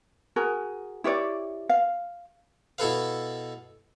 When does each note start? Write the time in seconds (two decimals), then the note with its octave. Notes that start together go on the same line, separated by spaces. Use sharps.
0.36 F#4 G#4 A#4
1.04 E4 G4 C#5 D5
1.69 F5
2.78 B2 E4 A4 B4 F5